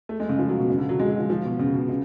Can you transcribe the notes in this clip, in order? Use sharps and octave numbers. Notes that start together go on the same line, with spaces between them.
A3
G#3
C#3
F3
F#3
B2
C#3
D3
F#3
G#3
F#3
F3
F3
B2
C#3
B2
C#3